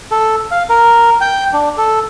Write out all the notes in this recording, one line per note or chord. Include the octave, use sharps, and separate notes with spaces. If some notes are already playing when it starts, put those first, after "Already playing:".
A4
F5
A#4
G5
D4
A4